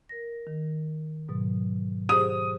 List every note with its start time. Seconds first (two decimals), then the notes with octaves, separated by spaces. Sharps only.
0.09 A#4 A#6
0.47 D#3
1.29 G#2 B2 F#3
2.09 G4 G#4 C5 D#6